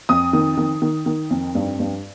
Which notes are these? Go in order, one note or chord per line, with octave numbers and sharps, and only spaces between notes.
F2 D#6
D#3
D#3
D#3
D#3
F2
G2
G2